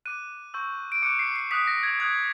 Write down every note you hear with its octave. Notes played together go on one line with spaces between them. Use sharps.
D6 F#6 D#7
C#6 E6 G6
D7
D6 F#6 C#7
C7
C7
D#6 F#6 B6
A#6
G#6
D#6 F#6 G#6